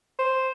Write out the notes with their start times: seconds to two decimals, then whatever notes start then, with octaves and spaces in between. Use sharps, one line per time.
0.19 C5